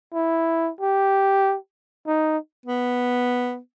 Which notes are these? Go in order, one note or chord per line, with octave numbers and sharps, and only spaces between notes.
E4
G4
D#4
B3